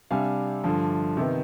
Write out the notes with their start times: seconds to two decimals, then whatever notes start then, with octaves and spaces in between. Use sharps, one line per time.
0.11 C3 G3 D4 F5 G#5
0.64 G2 D3 F3
1.17 C3 D#3 B3